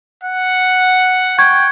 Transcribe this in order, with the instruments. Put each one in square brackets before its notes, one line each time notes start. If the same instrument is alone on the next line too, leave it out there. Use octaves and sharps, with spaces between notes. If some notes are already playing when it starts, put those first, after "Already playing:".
[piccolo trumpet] F#5
[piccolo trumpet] G5 [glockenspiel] C#6 G#6